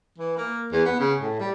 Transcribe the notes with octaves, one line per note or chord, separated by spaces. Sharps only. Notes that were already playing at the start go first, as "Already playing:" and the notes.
E3
A#3
E2
B3
C#3
A2
G3